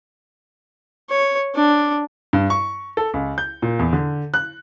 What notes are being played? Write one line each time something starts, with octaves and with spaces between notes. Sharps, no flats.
C#5
D4
G2
C#6
A4
C#2
G6
A#2
E2
D3
F#6